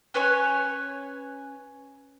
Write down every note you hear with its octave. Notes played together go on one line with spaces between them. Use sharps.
C#4 B4 C#5 G#5